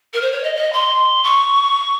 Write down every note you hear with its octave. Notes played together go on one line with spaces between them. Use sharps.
A#4
C5
C#5
D#5
D#5
C6
C#6